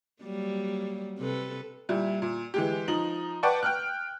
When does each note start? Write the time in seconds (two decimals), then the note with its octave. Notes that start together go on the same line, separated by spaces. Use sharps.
0.22 F#3 G3 A#3
1.19 C3 A4 B4
1.89 A#2 G3 E4
2.22 A#2
2.54 E3 G#3 G4
2.88 F3 D#4 F#7
3.43 B4 D5 F#5 G5 A5 C#6
3.63 G5 F6 F#6